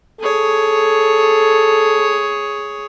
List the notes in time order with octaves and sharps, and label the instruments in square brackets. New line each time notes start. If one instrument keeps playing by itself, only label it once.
[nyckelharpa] G#4 C#5 [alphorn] A4